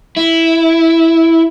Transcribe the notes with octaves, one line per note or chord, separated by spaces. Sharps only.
E4